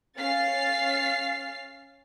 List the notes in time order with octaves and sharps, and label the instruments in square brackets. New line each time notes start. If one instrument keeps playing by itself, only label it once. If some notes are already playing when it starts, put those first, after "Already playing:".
[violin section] C#4 F5 F6 A6 C7